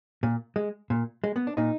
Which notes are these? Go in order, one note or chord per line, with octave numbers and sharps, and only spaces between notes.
A#2
G#3
A#2
G#3
B3
D4
A#2 D#4